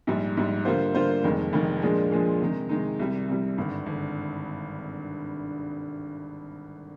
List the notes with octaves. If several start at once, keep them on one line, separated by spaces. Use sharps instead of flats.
A#1 G#2 G3
A#1 G#2 G3
D3 G3 A#3 F4 C5
D3 G3 A#3 F4 C5
F1 F2 D#3 G#3
F1 F2 D#3 G#3
A#2 F3 G#3 D4 G#4
A#2 F3 G#3 D4 G#4
C3 D#3 G#3 D#4
C3 D#3 G#3 D#4
C2 C3 G3
C2 C3 G3
G#1 G2 D3
G#1 D3